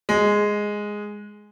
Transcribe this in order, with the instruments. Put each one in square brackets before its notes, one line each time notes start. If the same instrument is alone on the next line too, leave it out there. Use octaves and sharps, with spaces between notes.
[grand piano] G#3